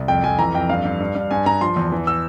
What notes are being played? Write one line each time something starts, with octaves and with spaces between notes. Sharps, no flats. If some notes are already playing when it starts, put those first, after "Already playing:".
Already playing: C2
F2 G5
F2 G#5
E3 A#5
F2 G5
G2 F5
G2
G2
G2
G2 G#5
G2 A#5
F3 C6
E2
E3
E6